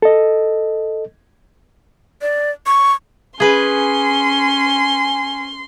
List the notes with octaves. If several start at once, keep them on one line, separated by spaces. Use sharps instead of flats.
A4 D#5
D5
C#6
C#4 G#4 B4 G#5 C6